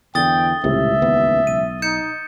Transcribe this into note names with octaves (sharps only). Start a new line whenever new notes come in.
E2 D3 E3 G5 D#6 A6 G7
D#1 C#2 A2 C3 E5
A1 D#2 B3
B1 D#7
D#4 G6 C#7 E7